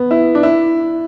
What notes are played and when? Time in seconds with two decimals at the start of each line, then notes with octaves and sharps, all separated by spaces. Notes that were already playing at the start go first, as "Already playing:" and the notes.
Already playing: B3
0.11 E4
0.35 D4
0.43 E4